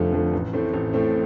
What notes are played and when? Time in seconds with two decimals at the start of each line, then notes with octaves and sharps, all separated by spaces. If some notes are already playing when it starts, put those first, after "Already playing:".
Already playing: F1 F2 D3 F3 A3
0.13 F2 D3 F3 A3
0.33 A1
0.53 A2 A3 C4
0.73 A1
0.93 A2 A3 C4